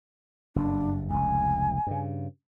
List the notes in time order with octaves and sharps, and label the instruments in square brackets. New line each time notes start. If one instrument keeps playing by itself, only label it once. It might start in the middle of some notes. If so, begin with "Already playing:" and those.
[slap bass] F#1 G2 [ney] D4
[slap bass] F1 C#2 [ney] G#5
[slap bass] G2 C#3